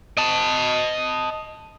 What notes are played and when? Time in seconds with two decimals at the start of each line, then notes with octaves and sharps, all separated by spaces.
0.17 D#5 A5